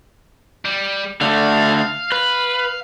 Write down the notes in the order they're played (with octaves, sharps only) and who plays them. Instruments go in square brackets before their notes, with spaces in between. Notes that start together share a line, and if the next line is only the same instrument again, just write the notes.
[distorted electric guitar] G3
[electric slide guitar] D3 A3 [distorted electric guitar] F5
[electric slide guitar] B4